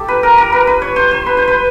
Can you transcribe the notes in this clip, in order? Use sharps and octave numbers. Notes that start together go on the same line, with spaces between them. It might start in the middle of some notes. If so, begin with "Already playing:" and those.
Already playing: G4 A4
B4
A#4
A#4
B4
B4
C#5
C5
C5
B4
C5
B4